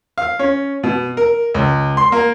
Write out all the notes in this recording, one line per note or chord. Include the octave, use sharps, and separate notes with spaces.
F5
C#4
B2
A#4
C#2
C6
A#3